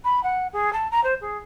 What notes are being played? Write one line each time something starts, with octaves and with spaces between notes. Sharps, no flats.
B5
F#5
G#4
A5
A#5
C5
G#4